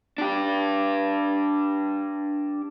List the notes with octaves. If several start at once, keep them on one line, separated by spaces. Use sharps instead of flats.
D4 G4